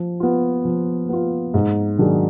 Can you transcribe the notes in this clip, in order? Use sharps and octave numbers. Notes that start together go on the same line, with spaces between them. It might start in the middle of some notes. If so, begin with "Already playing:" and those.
Already playing: F3
B3 F4
F3
B3 F4
G#2
D#3 F#3 D4 G#4